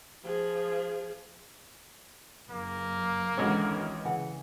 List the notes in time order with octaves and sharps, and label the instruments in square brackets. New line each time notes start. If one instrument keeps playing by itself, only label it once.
[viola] F3 G#4
[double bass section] F#1 [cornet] A#3
[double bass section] G#1 E3 [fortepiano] C#2 G#3 C#5 [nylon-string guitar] D3 C#4 F#4
[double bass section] C#3 [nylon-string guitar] E3 F#5